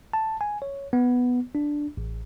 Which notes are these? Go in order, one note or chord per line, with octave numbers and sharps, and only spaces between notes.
A5
G#5
C#5
B3
D4
A1